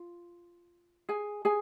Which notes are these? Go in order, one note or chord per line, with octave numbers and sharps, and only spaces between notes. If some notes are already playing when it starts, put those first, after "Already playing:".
Already playing: F4
G#4 G#5
G#4 G#5